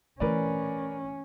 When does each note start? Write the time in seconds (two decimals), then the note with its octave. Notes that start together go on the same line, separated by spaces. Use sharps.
0.20 E3 A3 C#4 A#4 B4 D5